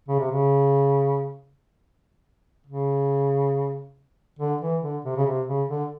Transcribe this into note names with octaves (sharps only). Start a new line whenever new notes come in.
C#3
C3
C#3
C#3
D3
E3
D3
C3
C#3
C3
C#3
D3